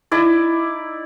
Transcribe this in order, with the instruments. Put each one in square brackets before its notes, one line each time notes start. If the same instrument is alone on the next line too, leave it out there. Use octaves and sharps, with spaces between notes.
[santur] D#4 E4 D5